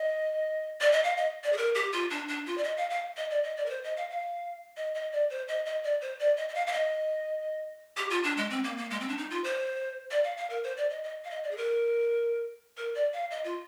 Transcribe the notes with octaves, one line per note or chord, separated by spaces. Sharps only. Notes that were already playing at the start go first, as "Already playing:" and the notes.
Already playing: D#5
D5
D#5
F5
D#5
D5
G#4
A#4
G4
F4
D4
D4
F4
D5
D#5
F5
F5
D#5
D5
D#5
D5
A#4
C5
D#5
F5
F5
D#5
D#5
D5
C5
D#5
D#5
D5
C5
D5
D#5
D#5
F5
F5
D#5
G4
F4
D4
G#3
C4
A#3
A#3
G#3
C4
D4
D#4
F4
C5
D5
F5
F5
A#4
C5
D5
D#5
D#5
F5
D#5
D5
G#4
A#4
A#4
D5
F5
D#5
F4